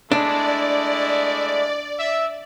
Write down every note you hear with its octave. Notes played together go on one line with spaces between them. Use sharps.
G#3 A3 D4 E4 D5
E5